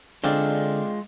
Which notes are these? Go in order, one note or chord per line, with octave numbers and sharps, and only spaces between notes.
D3 G#3 C4 D4 F4